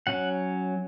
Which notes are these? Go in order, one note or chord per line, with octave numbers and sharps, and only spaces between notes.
F#3 C#4 F#5